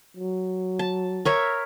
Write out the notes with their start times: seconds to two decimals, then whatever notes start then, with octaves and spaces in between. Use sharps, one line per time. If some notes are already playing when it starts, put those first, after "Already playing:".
0.17 F#3
0.79 A5
1.25 A#4 C#5 E5